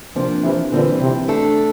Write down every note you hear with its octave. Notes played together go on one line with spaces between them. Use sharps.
C3 F3 A#3 D4
C3 E3
A#2 D3 E3 G3 C4
C3
A3 D4 A4